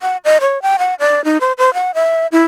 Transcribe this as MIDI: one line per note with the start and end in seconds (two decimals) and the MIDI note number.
0.01 0.17 78
0.24 0.37 75
0.41 0.61 73
0.62 0.77 79
0.79 0.94 78
1.00 1.24 74
1.24 1.38 63
1.41 1.53 72
1.58 1.73 72
1.74 1.91 78
1.95 2.27 76
2.32 2.44 64